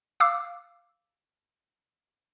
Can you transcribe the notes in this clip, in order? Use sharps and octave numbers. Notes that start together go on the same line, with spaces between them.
F5 D6 E6